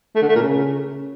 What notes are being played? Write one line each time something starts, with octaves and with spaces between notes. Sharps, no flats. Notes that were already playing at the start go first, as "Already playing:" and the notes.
A3
D3
A3
A#2
C#3